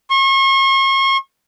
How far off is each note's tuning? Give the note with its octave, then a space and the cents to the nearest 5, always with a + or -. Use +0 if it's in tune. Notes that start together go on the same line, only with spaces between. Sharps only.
C#6 -40